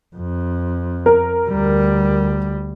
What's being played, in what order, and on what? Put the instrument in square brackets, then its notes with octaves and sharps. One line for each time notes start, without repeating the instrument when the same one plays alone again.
[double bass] F2
[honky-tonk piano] A#4
[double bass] D2 G3